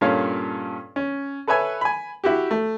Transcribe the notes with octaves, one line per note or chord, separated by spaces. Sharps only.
G2 A#2 C#4 A4 C#5 F5
C#4
A4 B4 C#5 E5 G#5
G#5 B5
E4 F#4 G4
A3